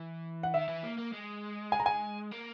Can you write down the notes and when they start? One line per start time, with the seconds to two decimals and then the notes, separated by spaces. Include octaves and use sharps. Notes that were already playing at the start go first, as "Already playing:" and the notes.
Already playing: E3
0.43 F#5
0.54 D#3 E5
0.68 E3
0.83 A#3
0.98 A#3
1.13 G#3
1.72 G#5
1.80 A#5
1.86 G#5
2.31 A#3